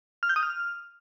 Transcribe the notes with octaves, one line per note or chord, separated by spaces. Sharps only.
F6
G6
D#6
F6